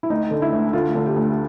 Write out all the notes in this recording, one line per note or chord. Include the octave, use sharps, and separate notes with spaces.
E4
D2 D#4
D3
E4
D2
D3 F4
D3
G4
D2